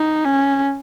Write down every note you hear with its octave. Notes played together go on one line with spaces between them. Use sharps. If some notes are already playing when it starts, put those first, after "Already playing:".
Already playing: D#4
C#4